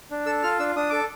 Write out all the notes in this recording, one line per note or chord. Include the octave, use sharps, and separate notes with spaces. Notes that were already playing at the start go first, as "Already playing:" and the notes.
D4
A4 E6
F4 F6
D4 E6
D4 D#6
A4 D6